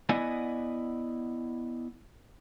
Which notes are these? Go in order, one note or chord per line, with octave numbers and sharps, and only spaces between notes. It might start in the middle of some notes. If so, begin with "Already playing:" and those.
B3 E4 D5 D#5 F#5 G#5